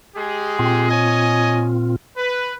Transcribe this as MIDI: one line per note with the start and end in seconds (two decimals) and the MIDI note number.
0.16 0.86 56
0.16 0.86 67
0.16 0.86 68
0.59 1.96 46
0.59 1.96 60
0.59 1.96 65
0.89 1.69 73
0.89 1.69 75
0.89 1.69 80
2.17 2.54 71